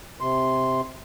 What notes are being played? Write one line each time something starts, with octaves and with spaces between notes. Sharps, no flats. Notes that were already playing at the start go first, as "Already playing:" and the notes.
C3 C6